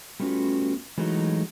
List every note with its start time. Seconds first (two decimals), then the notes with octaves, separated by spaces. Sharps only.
0.20 G3 A3 B3 C#4 F4 F#4
0.98 E3 F#3 G#3 A3 D#4 F#4